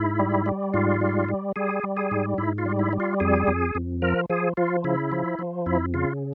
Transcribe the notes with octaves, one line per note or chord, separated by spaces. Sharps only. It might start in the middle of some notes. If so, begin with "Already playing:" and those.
Already playing: G#2 E4
G3
G3
G#2 F4
G3
G3
G3 G#4
G3
G#4
G#2
G#2 E4
F4
G3
E4
G3
F4
F2 G#4
F2
F2
F3 A#4
F3 G#4
F3 F4
C#3 E4
F3
F3
F2 E4
C#3 F4